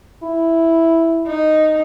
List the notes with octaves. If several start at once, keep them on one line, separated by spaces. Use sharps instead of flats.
E4
D#4